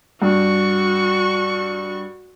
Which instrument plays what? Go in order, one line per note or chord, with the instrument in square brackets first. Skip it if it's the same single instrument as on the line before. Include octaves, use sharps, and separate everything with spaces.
[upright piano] G2 [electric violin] F#4 C#6